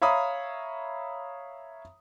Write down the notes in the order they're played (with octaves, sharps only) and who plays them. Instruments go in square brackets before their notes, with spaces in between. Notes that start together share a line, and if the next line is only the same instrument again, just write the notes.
[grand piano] C#5 E5 F5 A#5 B5 D#6